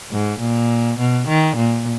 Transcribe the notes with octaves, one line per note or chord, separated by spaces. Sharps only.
G#2
A#2
B2
D#3
A#2